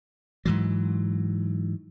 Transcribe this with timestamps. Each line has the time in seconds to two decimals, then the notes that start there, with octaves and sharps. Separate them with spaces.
0.45 G#2 E3 F#3